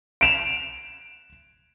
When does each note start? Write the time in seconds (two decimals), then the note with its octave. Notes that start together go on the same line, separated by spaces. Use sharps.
0.21 D7 E7 F7